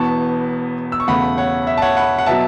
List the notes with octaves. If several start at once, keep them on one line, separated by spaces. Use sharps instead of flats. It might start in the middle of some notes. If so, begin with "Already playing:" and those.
Already playing: E1 E2 E3 B3 A5 C#6
E6
C#6
E1 E2 C#3 A3 F#5 B5
C#5 F#5
E5
A5
C#5 F#5
F#5 B5
F#5
B2 F#3 E5 A5